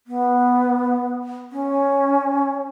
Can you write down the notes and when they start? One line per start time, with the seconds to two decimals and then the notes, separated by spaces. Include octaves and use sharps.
0.07 B3
1.52 C#4